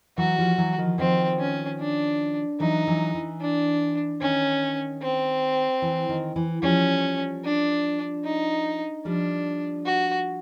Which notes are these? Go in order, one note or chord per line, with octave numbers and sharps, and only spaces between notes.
E3 F#3 F#4
F3 G3
E3 F#3
D#3 F3
D#3 F3 C4
C#4
D4
E3 F#3 D#4
E3 F#3
E3
D4
D#3 C#4
C4
E3
D#3
E3
F3 G3 C#4
D4
D#4
F3 G3 D4
F#4